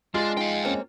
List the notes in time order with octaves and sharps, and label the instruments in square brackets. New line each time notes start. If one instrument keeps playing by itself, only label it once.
[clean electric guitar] G#3 [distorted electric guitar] D4 [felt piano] F4
[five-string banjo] D#4 [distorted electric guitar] F5 G5
[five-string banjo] A#3 C4 C#4